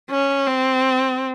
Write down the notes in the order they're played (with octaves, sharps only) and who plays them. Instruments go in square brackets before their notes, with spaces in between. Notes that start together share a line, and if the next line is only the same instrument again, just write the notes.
[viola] C#4
C4